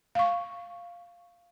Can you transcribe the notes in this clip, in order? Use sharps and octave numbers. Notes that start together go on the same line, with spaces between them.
F5 C#6